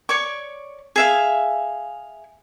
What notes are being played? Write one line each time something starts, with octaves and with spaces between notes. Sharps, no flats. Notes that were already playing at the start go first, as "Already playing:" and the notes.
C#5 D5 C#6
G#4 E5 F5